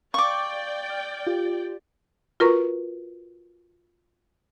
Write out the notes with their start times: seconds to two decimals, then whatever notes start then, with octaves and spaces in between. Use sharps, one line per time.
0.14 D5 F5 G5 C#6 D6
0.90 F6
1.27 F4 G4
2.40 F4 F#4 A#4 B4 A#5 C#6